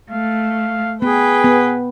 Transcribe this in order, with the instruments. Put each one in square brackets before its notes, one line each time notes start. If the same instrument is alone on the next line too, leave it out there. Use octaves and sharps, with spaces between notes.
[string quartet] A3 [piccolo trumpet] F5
[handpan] B3 [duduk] G#4 [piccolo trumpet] B4 [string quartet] G5
[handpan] B3